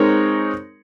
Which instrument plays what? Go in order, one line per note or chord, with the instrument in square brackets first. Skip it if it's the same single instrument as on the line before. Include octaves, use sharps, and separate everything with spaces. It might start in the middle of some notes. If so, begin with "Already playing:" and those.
Already playing: [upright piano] G#3 C4 D#4 A#4 C#5